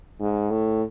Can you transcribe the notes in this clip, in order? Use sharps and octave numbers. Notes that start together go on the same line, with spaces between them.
G#2
A2